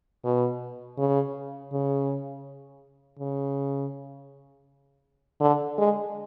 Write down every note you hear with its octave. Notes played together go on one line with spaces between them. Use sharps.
B2
C#3
C#3
C#3
D3
G#3